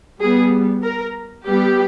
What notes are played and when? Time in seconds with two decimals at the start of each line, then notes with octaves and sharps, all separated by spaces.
0.19 G3 B3 G#4
0.82 A#4
1.45 G3 B3 G4